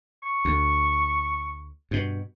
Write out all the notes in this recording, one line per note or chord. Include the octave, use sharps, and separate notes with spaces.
C#6
D2
G2 B2